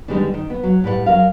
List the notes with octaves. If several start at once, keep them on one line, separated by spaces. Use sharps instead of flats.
D3 D#3 G3 G#3 B3 D4
D#3
B3
F#3
A2 G3 B4 C#5 F#5
F#3 A#4 F5